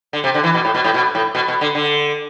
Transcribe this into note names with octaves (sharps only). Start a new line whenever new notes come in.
D3
C3
D3
E3
B2
A2
B2
A2
B2
A2
B2
B2
D3
D3